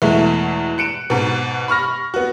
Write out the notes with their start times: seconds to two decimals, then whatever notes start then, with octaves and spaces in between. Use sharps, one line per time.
0.02 E2 B2 E3 G#3 A3
0.78 F#6 C#7 D7 E7
1.10 G#2 B2
1.68 B5 C#6 F6 A#6
2.14 B3 F#4